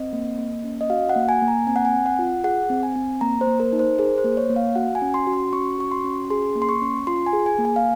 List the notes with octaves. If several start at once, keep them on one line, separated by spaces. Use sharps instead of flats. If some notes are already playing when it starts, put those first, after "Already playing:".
Already playing: C4 D#5
A#3
A#3
C#4
D#5
F#4 F5
F#5
A#3
G#5
A#3
A#5
C4 G#5
F#5
G#5
C4
F#5
F4
G#4 F#5
C4
G#5
C4
A#3 A#5
C5
A#3
A#4
D#4
C5
G#4 A#4
C5
A#3
C#5
A#3
F5
F#4 F#5
G#5
C#4
C6
F#4
C6
C#4 C#6
F#4 C#6
C6
C#4
G#4 C6
A#3
C6
C#6
C#4
F4 C6
G#5
G#4
G#5
A#3
G#5
F5